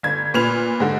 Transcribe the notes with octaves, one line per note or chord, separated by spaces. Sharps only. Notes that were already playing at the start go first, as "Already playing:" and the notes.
G1 G#6
A#2 B4 F6 F7
G#2 D3